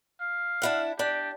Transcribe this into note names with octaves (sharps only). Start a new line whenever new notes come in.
F5
D4 E4 F#5
D4 G4